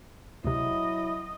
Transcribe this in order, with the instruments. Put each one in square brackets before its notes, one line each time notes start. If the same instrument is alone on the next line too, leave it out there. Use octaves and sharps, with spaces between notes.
[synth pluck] D2 C3 [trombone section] F#3 E4 [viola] D#5